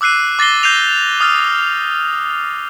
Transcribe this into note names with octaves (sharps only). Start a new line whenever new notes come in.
D6 E6 F#6 C7 D#7
D6 A6 A#6 C7 G7
G6 C7 D#7 F7
D#6 F6 A6